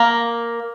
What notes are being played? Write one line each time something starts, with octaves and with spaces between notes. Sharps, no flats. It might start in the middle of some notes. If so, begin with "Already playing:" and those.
Already playing: A#3